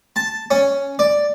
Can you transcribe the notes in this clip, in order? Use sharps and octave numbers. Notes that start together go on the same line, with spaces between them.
A5
C#4
D5